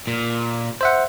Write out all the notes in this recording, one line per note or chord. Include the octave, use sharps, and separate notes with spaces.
A#2
C5 E5 F#5